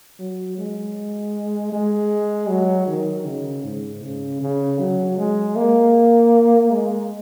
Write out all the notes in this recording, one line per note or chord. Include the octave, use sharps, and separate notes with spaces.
F#3
G#3
G#3
F#3
D#3
C#3
G#2
C#3
C#3
F#3
G#3
A#3
G#3